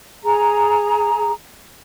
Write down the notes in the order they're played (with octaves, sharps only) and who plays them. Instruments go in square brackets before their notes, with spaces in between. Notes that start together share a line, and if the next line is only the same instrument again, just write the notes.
[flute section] G#4 A#5